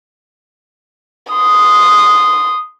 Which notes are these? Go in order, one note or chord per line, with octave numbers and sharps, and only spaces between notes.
C6 D#6